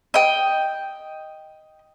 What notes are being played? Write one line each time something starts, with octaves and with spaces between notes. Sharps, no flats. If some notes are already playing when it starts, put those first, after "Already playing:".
D#5 G5